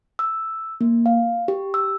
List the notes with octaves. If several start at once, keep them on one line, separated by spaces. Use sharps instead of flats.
E6
A#3
F5
G4
E6